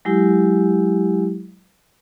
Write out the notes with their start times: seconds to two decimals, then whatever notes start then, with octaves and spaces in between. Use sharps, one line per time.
0.05 F#3 G#3 E4 G4